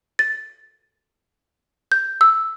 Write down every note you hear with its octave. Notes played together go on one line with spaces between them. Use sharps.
A6
G6
E6